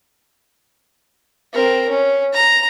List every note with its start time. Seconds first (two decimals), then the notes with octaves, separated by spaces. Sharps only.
1.54 C4 A#4
1.89 C#4
2.33 A#5